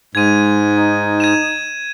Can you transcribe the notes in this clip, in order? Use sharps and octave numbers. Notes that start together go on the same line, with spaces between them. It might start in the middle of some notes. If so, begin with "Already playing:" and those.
G#2 G#3 G#6 D#7
D#4
G#6 D#7 E7